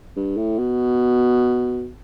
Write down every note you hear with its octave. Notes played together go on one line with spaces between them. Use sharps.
G2
A2
B2